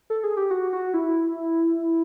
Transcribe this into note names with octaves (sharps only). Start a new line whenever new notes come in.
A4
G#4
G4
F#4
F#4
E4